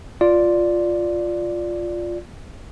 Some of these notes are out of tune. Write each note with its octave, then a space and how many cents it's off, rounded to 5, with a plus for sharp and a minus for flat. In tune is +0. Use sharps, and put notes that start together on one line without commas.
F4 +0 D5 +0